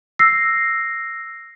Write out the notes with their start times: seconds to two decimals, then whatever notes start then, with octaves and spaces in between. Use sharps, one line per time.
0.19 E6 A#6 C7